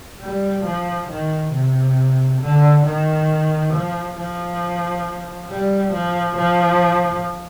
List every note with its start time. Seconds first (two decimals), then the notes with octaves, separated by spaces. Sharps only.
0.21 G3
0.65 F3
1.09 D#3
1.53 C3
2.41 D3
2.85 D#3
3.73 F3
4.17 F3
5.50 G3
5.93 F3
6.37 F3